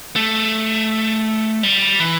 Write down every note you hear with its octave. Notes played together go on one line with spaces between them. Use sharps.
A3
G3
E3